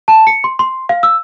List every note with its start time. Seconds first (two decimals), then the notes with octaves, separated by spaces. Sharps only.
0.08 A5
0.27 C#7
0.44 C6
0.59 C6
0.89 F5
1.03 E6